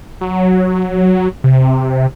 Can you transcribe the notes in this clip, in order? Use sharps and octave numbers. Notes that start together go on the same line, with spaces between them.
F#3
F#3
C3